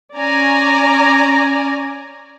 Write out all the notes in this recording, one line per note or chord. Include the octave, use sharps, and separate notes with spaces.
C#4 D5 G#5 A#5